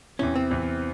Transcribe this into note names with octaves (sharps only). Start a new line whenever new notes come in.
E2 C3 E3 C#4
C4
E2 C3 E3